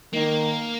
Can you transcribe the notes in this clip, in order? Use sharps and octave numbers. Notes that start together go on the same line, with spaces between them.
D#3 A#3